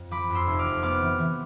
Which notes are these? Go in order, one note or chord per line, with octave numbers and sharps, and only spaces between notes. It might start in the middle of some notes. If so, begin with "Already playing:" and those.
Already playing: F2
F3 B5 D6
F2
C6 E6
F1
D6 F6
F2
B3 D6 F6
E3
E3